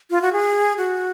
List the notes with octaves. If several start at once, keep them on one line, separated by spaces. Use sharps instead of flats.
F4
F#4
G#4
F#4